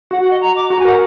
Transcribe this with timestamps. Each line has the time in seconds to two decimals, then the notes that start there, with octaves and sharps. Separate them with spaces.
0.11 F#4 F#5
0.21 F#5
0.30 D#5
0.41 A#5
0.56 D6
0.70 F#4 A#5
0.79 G#5
0.85 A#4 F#5